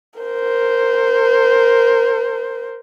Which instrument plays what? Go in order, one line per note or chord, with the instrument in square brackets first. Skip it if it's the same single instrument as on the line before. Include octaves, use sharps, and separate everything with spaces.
[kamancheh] A#4 C5